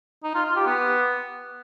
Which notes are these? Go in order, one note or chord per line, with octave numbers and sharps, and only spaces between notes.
D#4
F4
F4
G4
B3